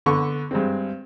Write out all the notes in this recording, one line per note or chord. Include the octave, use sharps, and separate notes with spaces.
D3 B3 C#6
G2 G#3 C4